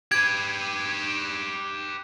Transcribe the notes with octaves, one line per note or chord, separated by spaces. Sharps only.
G4 B4 G#6